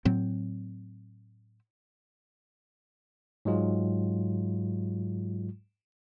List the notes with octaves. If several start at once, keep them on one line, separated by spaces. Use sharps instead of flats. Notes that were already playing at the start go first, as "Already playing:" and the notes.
A2 F#3 C4
G#2 F#3 G#3 F4